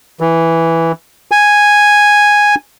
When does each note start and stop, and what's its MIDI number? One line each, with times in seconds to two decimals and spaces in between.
0.20 0.92 52
1.31 2.55 80